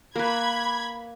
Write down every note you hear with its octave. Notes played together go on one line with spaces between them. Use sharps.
A#3 B4 B5 G#6